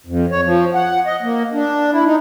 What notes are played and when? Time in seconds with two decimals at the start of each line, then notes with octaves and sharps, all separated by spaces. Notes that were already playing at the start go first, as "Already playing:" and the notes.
0.06 F2
0.31 C#5
0.44 F3
0.74 F#5
1.06 D#5
1.22 A#3
1.53 D4
1.92 E4
2.05 D#4